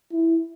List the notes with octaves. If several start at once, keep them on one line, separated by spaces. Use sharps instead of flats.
E4